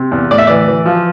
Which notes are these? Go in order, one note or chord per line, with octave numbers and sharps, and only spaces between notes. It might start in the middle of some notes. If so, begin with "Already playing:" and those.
Already playing: C3
E2
A2 D5
E5
E3 D5
E3
F3